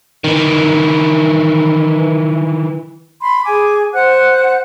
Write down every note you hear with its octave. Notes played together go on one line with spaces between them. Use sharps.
D#3 E3
B5 C6
G#4 G#5 D6
C5 F#5 F#6